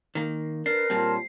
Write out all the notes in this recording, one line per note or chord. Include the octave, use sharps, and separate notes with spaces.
D#3 A#3
D4 A#4 B4 C7
A#2 G3 C4 F4 C#5 A5